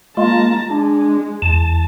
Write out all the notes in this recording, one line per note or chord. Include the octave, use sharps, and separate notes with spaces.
G#3 A#3 F4 A5 A#5
G#3 D4
E2 A5